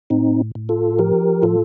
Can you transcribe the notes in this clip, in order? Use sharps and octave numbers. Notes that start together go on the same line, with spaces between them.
A2 C4 D#4
A2
F4 A4
F3 G4 A#4
A2 F4 A4